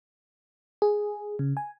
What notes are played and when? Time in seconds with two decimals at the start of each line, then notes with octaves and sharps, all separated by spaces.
0.82 G#4
1.39 C#3
1.57 G#5